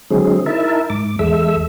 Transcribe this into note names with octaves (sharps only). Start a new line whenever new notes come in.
D3 F#3 G#3 C4 G#4
D#4 E4 A#4 E5 A5
G#2 D6
E2 G#3 A4 E5 E6